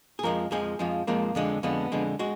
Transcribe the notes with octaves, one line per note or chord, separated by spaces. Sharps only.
G#4
F2 F3 G#3 A#4
F2 F3 G#3 G#4
F2 F3 G#3
F2 F3 G#3 A#3
F2 D3 G#3
F2 D3 G#3 B3
F2 D3 G#3
G#3 F#4